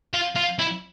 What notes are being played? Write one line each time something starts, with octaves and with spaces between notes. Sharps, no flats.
F4
F4
E4